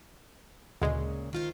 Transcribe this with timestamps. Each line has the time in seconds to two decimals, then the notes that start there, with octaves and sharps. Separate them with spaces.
0.82 D2 A#2 C#3 G#3
1.33 D#3 F4 C5